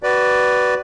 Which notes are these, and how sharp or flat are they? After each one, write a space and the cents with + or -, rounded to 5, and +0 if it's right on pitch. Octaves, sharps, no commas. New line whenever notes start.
F#4 +30 B4 +0 D5 +0